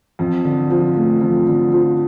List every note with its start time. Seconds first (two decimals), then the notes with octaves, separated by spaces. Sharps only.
0.19 F2
0.45 D3
0.71 F3
0.96 A3
1.21 F2
1.47 D3
1.73 F3